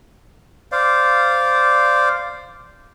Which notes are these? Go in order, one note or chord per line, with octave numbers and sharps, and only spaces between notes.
C5 D5 F5